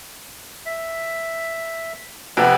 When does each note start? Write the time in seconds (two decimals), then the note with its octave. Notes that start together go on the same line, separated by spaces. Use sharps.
0.66 E5
2.37 F2 C3 B3 B4